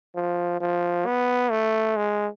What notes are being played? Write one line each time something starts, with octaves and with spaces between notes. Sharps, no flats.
F3
F3
B3
A3
G#3